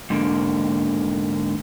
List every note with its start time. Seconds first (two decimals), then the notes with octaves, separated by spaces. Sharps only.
0.10 G#2 D3 A#3